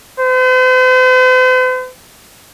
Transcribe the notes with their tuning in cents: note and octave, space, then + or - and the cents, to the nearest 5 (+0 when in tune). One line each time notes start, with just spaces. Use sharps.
C5 -45